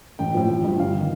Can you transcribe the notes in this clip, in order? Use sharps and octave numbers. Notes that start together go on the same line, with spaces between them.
A1 G5
A2 F3
A1
G2 F3
G1 F5
D#3